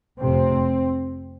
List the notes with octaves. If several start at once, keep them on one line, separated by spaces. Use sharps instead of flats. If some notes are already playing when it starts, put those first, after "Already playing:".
F1 F2 C3 C4